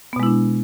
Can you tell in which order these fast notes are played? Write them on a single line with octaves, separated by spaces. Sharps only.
B3 B2 G#3 E4 D4